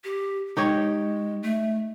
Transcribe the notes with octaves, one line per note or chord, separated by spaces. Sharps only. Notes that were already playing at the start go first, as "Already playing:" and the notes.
G4
G#3 D#4 G4 C#5
A3